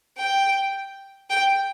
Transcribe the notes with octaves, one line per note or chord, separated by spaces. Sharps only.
G5
G5